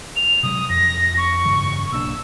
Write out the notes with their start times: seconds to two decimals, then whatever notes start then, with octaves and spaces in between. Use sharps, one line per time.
0.16 F7
0.43 C3 F#3 G#3 D#6
0.69 F2 A#6
1.17 C#6
1.45 G2 C#3 E3
1.92 B1 A#3 D4 E6